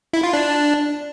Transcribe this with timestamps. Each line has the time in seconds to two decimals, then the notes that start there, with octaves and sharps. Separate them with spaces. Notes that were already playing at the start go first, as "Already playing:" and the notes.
0.13 E4
0.23 F4
0.33 D4